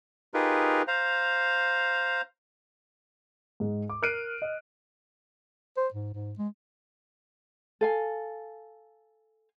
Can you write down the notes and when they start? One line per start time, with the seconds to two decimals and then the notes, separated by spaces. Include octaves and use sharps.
0.34 D#4 F4 G4 G#4 A#4 B4
0.88 C5 F5 A#5
3.60 G#2 G#3
3.90 D6
4.02 A#4 F6 F#6 C7 D7 D#7
4.42 D#5
5.77 C5
5.94 G#2
6.14 G#2
6.38 G#3
7.81 A4 F5 G#5